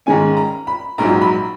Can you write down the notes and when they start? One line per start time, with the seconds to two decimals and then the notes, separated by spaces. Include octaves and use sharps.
0.06 G#2 D#3 G#3 C#4 G#5
0.37 A#5
0.67 B5
0.98 A#1 G#2 F#3 A#5
1.21 B5